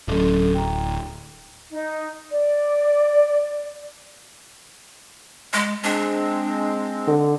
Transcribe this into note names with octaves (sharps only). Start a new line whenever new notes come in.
D1 F#3 C#4 A4
G5 A#5
D#4
D5
G#3
G#3 C4 D4
D3